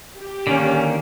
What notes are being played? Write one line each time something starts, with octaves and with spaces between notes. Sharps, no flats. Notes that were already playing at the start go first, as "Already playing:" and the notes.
G4
D3 D#3 A#3 C#4